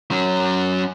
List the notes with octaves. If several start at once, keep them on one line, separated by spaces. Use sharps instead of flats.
F#3 C#4